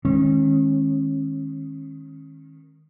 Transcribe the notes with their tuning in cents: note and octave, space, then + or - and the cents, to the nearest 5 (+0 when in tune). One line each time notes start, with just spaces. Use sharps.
D#3 +0 G#3 +0 C#4 -35